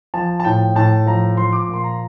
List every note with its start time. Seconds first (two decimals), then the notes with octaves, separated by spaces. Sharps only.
0.14 F3 A5
0.40 A5
0.45 A2 G5
0.75 A2 A5
1.06 F3 A#5
1.37 F3 C6
1.53 D6
1.68 A#2
1.74 C6
1.84 A#5